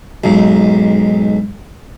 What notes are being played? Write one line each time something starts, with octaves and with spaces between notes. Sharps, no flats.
B1 G#2